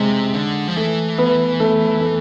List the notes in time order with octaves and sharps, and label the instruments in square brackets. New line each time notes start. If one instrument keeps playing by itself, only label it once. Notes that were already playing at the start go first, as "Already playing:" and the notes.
Already playing: [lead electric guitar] C3 [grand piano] G#3
[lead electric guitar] D3
F3
[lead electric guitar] E3 [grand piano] A3
[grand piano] B3
A3
A3